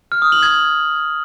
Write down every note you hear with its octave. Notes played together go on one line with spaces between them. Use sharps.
F6
D#6
F#7
G#6